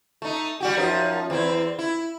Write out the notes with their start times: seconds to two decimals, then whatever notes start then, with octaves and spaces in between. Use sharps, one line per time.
0.22 A3 D#4
0.60 G3 F#4 G4
0.77 F#2 F3 D#4
1.30 E2 C4 E4
1.79 E4